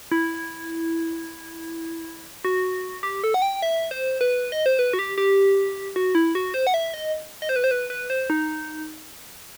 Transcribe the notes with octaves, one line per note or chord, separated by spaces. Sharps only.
E4
F#4
G4
A4
F#5
G5
E5
C5
B4
D#5
C5
B4
F#4
G4
G4
F#4
E4
F#4
C5
F#5
E5
D#5
D#5
C5
B4
C5
B4
B4
C5
D#4